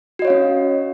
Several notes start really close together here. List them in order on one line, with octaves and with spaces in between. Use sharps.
F#4 D#5 C#5 F5 C#4